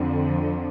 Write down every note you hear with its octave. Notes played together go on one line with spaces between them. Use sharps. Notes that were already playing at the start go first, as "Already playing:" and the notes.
Already playing: F2 D3 F3 C4